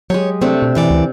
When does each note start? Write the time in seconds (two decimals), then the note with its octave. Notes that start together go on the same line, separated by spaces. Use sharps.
0.10 F#3 G#3 G4 C#5
0.41 C3 A3 C4 D4
0.62 B2
0.75 F#2 E3 D5
0.90 D2